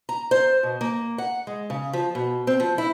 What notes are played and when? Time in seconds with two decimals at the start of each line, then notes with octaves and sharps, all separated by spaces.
0.09 A#5
0.31 C5
0.63 B2
0.81 A#3
1.18 F#5
1.47 G#3
1.70 C#3
1.93 F3
2.15 B2
2.47 C4
2.60 F3
2.78 E4